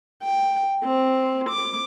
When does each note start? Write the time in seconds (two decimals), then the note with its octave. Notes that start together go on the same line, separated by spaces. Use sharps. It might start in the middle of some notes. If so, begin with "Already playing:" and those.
0.23 G5
0.84 C4
1.49 D6